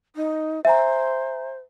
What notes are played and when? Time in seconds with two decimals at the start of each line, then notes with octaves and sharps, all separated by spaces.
0.16 D#4
0.65 C5 E5 G#5 A#5